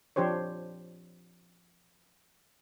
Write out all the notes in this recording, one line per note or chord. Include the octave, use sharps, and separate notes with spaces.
F3 D4 G4 C5 C#5